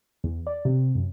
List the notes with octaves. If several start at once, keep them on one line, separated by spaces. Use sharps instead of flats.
E2
D5
C3
F#2